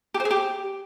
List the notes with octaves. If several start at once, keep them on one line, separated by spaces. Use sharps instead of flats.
G4
C5
G#4
G4